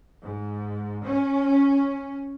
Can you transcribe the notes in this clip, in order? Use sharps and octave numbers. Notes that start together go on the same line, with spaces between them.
G#2
C#4